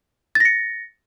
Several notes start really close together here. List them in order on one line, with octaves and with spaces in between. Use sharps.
A6 A#6 C#7